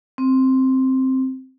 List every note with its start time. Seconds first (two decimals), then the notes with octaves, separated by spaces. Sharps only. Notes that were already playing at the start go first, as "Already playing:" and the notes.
0.18 C4